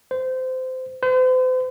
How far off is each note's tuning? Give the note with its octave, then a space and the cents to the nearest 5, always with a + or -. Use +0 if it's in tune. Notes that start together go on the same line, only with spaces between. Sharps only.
C5 -20
C5 -40